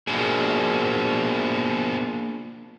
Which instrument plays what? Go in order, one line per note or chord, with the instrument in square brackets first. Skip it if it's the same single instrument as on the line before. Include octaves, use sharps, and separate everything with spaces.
[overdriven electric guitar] B2 F3 [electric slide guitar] A#3 D4 G#4